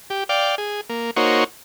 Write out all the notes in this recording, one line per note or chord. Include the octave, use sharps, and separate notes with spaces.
G4
D5 F5 G5
G#4
A#3
A#3 D#4 F#4 C5 C#5